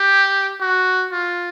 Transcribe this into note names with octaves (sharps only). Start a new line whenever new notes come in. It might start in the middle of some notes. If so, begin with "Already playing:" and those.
Already playing: G4
F#4
F4